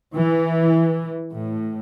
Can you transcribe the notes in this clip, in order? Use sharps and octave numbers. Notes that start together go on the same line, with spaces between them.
E3
A2